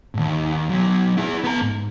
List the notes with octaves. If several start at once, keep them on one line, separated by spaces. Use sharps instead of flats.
D#2 G#2
B1 F#3
E4 G#4
B3 A#5
G#2